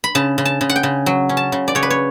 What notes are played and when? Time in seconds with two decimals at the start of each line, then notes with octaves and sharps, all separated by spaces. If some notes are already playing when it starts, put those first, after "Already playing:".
0.04 B5
0.15 C#3 A5
0.38 C#3
0.45 A5
0.61 C#3
0.69 F#5
0.76 G5
0.83 C#3
1.06 F#3
1.29 C#4
1.37 A5
1.52 C#3
1.68 D5
1.75 C#3 C#5
1.83 B4
1.90 C#5